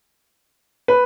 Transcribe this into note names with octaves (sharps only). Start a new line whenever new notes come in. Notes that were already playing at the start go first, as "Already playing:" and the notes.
B4